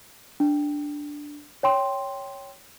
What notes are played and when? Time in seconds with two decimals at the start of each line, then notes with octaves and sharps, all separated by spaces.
0.40 D4
1.63 C#5 G5 C6